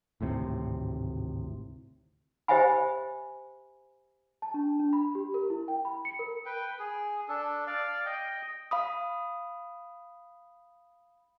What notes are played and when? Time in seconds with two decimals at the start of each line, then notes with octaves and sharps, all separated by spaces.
0.21 G#1 D2 A2 C3
2.48 G4 C5 D#5 E5 G#5 B5
4.42 A5
4.54 D4
4.79 D4
4.93 B5
5.15 G4
5.34 A#4
5.50 E4
5.68 G5
5.85 B5
6.05 C#7
6.19 A#4
6.46 B4 G5
6.79 G#4
7.28 D4 A4
7.67 D5 F5
8.06 D#5 G5
8.71 F5 B5 D#6